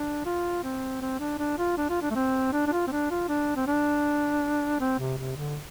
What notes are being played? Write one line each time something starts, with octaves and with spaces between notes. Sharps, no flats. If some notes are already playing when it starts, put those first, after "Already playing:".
Already playing: D4
F4
C4
C4
D4
D4
F4
D4
F4
D4
A3
C4
D4
D4
F4
C4
D4
F4
D4
C4
D4
C4
C3
C3
D3